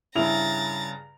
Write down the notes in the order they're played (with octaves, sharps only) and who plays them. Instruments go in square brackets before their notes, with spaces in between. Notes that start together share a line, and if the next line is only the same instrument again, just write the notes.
[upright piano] G2 C#3 [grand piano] E4 F7 [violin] A#5 A6